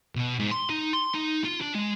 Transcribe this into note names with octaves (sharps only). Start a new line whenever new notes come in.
B2
G#2
C6
D#4
C6
D#4
F4
D4
G#3